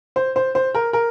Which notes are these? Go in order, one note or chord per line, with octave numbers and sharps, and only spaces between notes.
C5
C5
C5
A#4
A#4